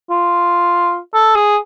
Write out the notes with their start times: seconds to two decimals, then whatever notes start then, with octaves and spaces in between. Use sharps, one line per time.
0.10 F4
1.14 A4
1.35 G#4